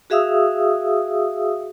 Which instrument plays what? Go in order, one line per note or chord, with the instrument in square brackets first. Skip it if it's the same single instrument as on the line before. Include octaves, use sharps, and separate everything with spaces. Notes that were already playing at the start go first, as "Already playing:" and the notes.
[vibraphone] F#4 G#4 E5 F5 D#6 E6